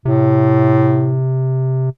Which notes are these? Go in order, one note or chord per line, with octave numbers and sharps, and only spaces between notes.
A2 C3